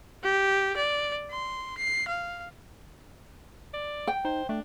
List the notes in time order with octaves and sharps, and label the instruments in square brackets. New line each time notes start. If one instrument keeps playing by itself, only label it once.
[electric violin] G4
D5
C6
C7
F5
[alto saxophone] D5
[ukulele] G5
[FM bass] D#4 [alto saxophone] C5
[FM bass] A3 [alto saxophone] D4